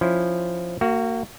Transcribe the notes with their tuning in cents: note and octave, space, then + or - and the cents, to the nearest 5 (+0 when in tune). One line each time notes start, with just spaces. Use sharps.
F3 +0 C#4 +5 E4 +0
A#3 -25 F#4 +15